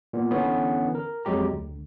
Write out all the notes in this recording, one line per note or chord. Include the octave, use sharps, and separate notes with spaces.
A#2 B3
D3 E3 B3 C#4 C#5
A#4
F2 F#3 G#3 G4 A#5
D2